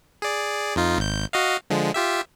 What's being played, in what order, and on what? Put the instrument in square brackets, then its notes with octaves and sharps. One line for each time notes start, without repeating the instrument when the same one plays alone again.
[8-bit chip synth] G#4 D5
F2 D#4 F4
G#1 G6
F#4 D#5 F5
D3 F3 G#3
F4 G4 E5